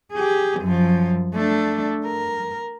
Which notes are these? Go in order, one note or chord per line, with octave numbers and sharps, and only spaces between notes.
G4 G#4
F#2 F3
A3 D4
A#4